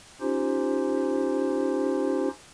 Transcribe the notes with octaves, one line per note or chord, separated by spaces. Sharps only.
C#4 D#4 F4 G4 C5